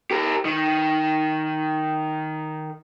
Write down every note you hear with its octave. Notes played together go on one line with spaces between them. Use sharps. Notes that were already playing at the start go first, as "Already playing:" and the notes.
G4 A#4
D#3